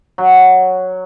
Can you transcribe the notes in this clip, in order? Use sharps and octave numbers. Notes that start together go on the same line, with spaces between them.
F#3